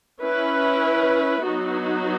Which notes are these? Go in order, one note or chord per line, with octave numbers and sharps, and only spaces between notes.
C#4 E4 B4
F#3 B3 D#4 F#4